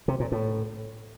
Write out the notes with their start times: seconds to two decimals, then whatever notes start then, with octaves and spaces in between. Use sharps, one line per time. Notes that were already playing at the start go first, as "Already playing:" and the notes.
0.08 C3
0.20 A#2
0.32 A2